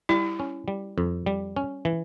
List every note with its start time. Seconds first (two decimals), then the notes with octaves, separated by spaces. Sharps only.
0.09 G3 E4
0.40 C#4
0.68 G3
0.98 F2
1.26 G3
1.56 C#4
1.85 E3